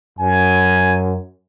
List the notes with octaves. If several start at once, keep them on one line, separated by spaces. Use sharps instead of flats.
F#2 G#5